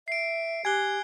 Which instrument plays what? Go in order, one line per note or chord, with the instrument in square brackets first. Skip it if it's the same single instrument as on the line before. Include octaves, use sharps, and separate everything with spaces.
[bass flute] E5 [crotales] C7 D7
[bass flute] G4 [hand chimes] G#5 F#6 [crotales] G#6 C7 G7